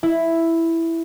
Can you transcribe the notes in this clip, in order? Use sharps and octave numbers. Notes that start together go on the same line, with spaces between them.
E4